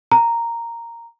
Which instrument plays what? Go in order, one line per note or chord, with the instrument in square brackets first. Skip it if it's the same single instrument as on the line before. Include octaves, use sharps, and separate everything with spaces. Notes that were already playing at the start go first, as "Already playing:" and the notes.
[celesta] A#5